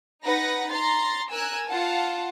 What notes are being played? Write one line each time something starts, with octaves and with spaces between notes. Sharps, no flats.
D#4 B4 F#5 A#6
A#5 C6 A6
A#4 G#5 E6 F#6
F4 F5 F#5 A5